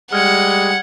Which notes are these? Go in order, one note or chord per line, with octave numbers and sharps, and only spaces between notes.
G3 G#3 F#5 F6 G#6 C#7